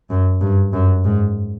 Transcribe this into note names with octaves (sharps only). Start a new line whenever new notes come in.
F#2
G2
F#2
G#2